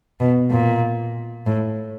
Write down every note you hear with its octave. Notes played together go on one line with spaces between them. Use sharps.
B2
A#2
A2